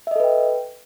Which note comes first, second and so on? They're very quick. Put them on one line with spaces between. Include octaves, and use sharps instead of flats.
E5 D#5 A4 B4 G5